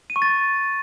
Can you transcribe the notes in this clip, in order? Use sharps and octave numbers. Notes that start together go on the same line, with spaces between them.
D#7
C#6
A6